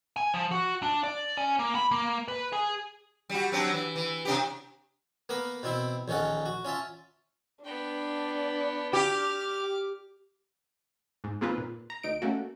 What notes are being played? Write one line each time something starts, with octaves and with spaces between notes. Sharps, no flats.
G#5
F3
F#4
D4
D5
C#4
A#3
B5
A#3
B4
G#4
G3 F#4
F#3 C4 D4
E3
E3
C3 D4 G4
A#3 B3 A#4 B4
B2 C4 E4 E5
A#1 D#3 C#4 A4 F#5
F#4
C#4 F4 E5 A5
B3 D4 G5
G4 D6 F6
G#2
D#3 G#3 A#3 C4 F4 B4
A#2
A#5
D2 D#4 D7
A3 A#3 C#4 F#4